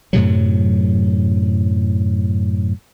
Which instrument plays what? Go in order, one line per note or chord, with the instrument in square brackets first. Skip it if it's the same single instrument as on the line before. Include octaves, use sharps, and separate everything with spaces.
[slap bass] F#2 A2 C3 F#3